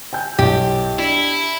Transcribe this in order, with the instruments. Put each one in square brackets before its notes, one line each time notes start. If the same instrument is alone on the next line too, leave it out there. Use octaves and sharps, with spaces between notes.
[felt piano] G5 G#5 G6
[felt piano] B1 E4 [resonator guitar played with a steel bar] G4
[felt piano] D4 [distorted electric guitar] E4